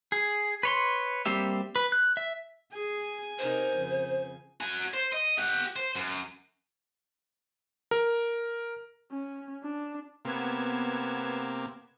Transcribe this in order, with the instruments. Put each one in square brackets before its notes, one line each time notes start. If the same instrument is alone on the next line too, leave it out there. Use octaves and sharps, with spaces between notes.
[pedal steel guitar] G#4
B4 C#5 C6
G3 A#3 C4 G4 E5
B4
F#6
E5
[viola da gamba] G#4 [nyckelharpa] G#5
[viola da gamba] C3 D#4 A#4 [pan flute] C5
[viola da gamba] F2 C#3
[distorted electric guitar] F#4 G#5
C5
D#5
G4 F#5
C5
F#2
[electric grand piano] A#4
[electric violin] C#4
D4
[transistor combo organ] C3 A#3 [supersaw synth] B3 G#6 E7